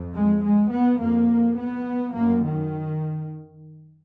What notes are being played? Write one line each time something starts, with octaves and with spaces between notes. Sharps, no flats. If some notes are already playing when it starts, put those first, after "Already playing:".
Already playing: F2
G#3
G#3
B3
F2 A#3
B3
F#2 A#3
D#3